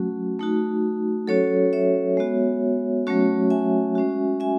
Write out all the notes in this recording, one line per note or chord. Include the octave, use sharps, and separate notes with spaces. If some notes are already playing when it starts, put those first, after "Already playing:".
Already playing: F#3 A3 C#4 F#4
A3 D#4 F#4
F#3 C#4 F#4 A4 C#5
C#5 E5
G#3 B3 F#4
F#3 A3 C#4 F#4
E5 G#5
G#3 C#4 F#4
E5 G#5